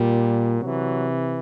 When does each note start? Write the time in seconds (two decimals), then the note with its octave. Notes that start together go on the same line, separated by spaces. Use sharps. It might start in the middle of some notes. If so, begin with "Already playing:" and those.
Already playing: A#2 G3
0.60 C3 E3 F#3